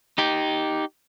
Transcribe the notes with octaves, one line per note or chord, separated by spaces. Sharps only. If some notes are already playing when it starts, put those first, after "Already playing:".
D#4 G4